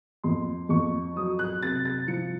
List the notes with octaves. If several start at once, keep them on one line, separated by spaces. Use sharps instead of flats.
F2 C6
F2 C#6
F#3 D#6
F#6
C3 A6
A6
F3 C#7